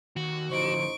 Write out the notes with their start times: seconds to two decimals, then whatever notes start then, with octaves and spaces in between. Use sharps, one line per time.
0.17 D#2 F#4
0.51 A1 D3 F3 D#4 C5 C#6 D7